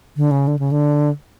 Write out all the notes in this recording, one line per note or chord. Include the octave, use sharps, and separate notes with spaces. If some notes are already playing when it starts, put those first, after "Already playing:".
D3
C#3
D3
C#3
D3